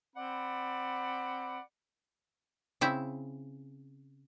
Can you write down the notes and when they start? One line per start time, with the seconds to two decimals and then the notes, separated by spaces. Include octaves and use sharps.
0.16 C4 D5 F#5 B5
2.81 C#3 C4 E4 E5